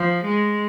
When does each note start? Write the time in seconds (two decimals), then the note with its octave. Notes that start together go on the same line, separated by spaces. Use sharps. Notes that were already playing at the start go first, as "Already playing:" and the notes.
Already playing: F3
0.25 G#3